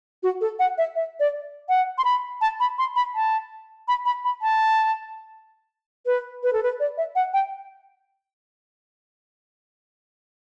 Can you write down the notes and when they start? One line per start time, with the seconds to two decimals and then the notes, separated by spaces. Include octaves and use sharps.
0.23 F#4
0.41 A4
0.59 F#5
0.78 E5
0.96 E5
1.20 D5
1.69 F#5
1.98 C6
2.05 B5
2.41 A5
2.60 B5
2.78 C6
2.96 B5
3.15 A5
3.88 B5
4.06 B5
4.25 B5
4.42 A5
6.06 B4
6.43 B4
6.53 A4
6.63 B4
6.80 D5
6.98 E5
7.16 F#5
7.33 G5